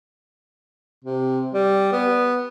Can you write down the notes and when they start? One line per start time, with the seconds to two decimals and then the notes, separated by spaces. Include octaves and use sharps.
1.04 C3
1.54 G3
1.92 B3